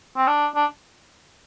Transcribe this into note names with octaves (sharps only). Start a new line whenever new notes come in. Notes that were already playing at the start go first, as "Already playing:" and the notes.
C4
D4
D4